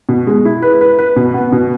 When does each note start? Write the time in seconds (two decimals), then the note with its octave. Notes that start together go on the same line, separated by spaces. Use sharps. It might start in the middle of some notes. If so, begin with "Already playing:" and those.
0.09 B2
0.27 G#3
0.45 E4
0.62 B4
0.81 B4
0.99 B4
1.16 B2
1.34 B3
1.52 B2